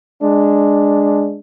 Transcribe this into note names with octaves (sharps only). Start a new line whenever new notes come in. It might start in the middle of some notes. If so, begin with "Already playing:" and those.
G#3 D4